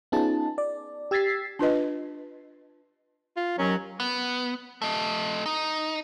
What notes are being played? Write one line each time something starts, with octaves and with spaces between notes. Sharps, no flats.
B3 C#4 D#4 F4 G#4 A5
D5
G4 E6 G#6 A6 B6 C7
D4 F4 B4 D#5
F4
D#2 F#3 C#4
B3
A3 D#5
D#4